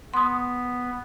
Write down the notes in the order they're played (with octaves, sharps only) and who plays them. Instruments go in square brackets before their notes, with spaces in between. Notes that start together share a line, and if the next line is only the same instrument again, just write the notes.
[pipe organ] B3 [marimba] C6 D#6